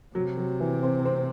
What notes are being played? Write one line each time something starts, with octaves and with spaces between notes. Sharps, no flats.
C3 F#3
F#3
E3
C4
C4